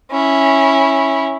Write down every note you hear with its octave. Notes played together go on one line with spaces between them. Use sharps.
C#4 E4